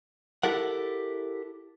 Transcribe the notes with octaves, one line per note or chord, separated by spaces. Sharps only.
E4 G4 A4 A#4 F#5